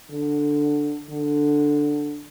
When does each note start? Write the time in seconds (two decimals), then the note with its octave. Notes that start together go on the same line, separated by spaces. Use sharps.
0.10 D3
1.10 D3